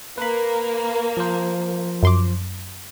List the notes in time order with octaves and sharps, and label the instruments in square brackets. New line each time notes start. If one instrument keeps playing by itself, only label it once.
[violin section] A#3 [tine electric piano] B4 B5
[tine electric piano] F3 C5
[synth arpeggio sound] F#2 C6 D6